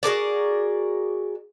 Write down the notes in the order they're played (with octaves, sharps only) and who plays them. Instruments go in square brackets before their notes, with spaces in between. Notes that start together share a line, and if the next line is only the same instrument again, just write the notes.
[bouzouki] F#4 G#4 A#4 D5